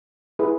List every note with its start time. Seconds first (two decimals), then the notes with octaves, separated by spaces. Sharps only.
0.39 E4 G#4 B4